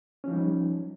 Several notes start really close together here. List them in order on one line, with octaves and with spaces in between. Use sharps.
C#4 F3 D#4 G3